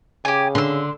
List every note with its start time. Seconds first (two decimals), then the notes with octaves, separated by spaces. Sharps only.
0.25 C#3 G4 G#5
0.55 D3 C6 E6